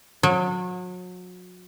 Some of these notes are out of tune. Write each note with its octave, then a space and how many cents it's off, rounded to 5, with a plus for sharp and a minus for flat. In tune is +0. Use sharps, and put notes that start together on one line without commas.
F#3 -35